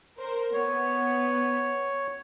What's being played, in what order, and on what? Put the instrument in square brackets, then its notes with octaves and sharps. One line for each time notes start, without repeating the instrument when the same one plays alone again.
[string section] A#4 C5
[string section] B3 [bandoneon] C#5